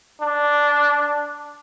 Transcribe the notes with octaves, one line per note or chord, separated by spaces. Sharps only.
D4